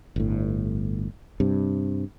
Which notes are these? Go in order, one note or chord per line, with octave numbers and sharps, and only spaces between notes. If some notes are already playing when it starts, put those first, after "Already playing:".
G1 A2
G2 C3